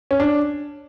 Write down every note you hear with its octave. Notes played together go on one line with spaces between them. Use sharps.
C#4
D4